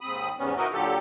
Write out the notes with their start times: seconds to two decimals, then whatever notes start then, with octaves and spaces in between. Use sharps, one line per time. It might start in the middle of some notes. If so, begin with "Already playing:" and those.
0.01 D#2 G#2 C4 B5 D#6
0.39 E2 G#2 C3 G3 B3 C#4
0.57 D#4 E4 F#4 A#4 B4 D#5
0.72 A#2 D3 F#3 G4 A4